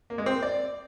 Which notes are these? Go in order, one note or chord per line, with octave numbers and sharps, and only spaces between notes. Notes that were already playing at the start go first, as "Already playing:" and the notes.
A#3
G#3
C4
A#3
D5